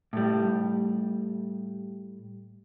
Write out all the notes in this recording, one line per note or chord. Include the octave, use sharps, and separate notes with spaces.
A2 G3